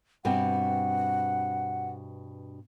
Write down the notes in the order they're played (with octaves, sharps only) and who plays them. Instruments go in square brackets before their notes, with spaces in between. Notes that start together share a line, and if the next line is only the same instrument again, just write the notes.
[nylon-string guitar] G2 B2 C4 [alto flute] F#5